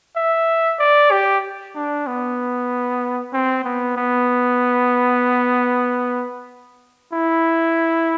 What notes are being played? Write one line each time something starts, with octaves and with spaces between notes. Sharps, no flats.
E5
D5
G4
D4
B3
C4
B3
B3
E4